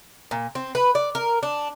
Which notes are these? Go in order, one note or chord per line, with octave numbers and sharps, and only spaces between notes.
A#2
C4
B4
D5
A#4
D4